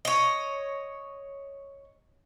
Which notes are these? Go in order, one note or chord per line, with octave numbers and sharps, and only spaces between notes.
C#5 D#5